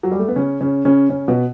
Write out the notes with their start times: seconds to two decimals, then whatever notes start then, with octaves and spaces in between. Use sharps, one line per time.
0.03 F#3
0.11 G3
0.19 A3
0.28 B3
0.36 C#3 C#4
0.61 C#3 C#4
0.85 C#3 C#4
1.09 C#3 C#4
1.28 B2 B3